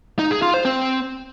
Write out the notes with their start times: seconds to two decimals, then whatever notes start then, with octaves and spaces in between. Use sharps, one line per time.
0.19 D#4
0.31 G#4
0.42 F4
0.54 C5
0.65 C4